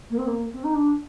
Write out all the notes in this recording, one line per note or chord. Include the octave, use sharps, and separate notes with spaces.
A#3
C4
A#3
C4
D#4
D4